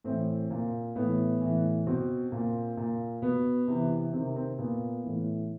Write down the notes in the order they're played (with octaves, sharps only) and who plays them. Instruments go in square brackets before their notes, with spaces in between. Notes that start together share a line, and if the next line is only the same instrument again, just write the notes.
[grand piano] A2 E3 C4
A#2
A2 E3 B3
A2 E3
B2 C4
A#2
A#2
B2 B3
C3 E3
C3 D#3 C4
C4
A#2 B3
A2 E3